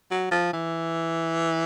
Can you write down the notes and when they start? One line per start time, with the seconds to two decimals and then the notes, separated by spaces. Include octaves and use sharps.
0.11 F#3
0.31 F3
0.53 E3